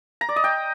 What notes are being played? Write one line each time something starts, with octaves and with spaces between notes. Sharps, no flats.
A#5
D5
D#5
G5